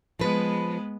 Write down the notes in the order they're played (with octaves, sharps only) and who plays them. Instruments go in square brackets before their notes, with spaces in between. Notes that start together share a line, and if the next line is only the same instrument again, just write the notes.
[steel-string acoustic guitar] F3 B4 [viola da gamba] G#3 B3